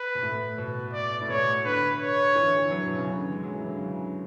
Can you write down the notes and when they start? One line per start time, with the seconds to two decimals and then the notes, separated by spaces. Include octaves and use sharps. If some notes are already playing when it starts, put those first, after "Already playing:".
Already playing: B4
0.15 B2
0.22 A2
0.58 B2
0.93 D5
1.21 A2
1.29 B2 C#5
1.64 D3 B4
2.00 C#5
2.35 E3
2.46 D3
2.58 E3
2.71 F#3
2.87 B2
2.97 C#3
3.07 D3
3.32 G#3
3.43 F#3
3.54 E3
3.67 D3
3.77 C#3